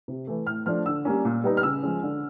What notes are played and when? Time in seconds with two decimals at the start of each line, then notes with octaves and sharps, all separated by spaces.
0.08 C3
0.27 E3 A3
0.46 A2 F6
0.66 F3 A3 D4 F6
0.86 D3 E6
1.05 G3 A#3 C#4
1.25 A#2
1.44 G3 B3 D#4
1.57 F6
1.63 C#3 E6
1.83 F3 G#3 C#4
2.03 D3